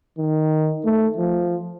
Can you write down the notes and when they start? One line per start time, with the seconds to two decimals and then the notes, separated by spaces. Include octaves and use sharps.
0.18 D#3
0.85 A3
1.18 F3